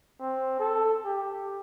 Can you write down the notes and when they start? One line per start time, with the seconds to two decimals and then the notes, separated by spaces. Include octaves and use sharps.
0.20 C4
0.60 A4
1.05 G4